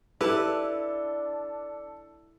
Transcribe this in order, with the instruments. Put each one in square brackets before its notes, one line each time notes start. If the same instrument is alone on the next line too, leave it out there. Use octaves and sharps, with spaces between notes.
[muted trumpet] D4 [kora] E4 [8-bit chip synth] G4 B4 [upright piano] A4